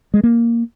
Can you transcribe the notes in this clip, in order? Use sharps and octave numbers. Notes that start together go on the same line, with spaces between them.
G#3
A#3